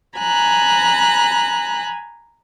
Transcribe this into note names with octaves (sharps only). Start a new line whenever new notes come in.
G#5 A#5 B5 F#6